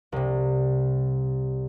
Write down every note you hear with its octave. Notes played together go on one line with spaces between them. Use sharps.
C2 C3